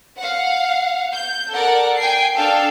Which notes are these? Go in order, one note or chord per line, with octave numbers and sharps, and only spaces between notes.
F5 F#5
G6
A4 A#4 D5 F#5
G5 G#5 C7
D4 A4 F5 G5